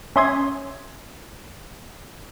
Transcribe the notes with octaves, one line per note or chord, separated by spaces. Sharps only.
C#4 E5 C6 D#6 G#6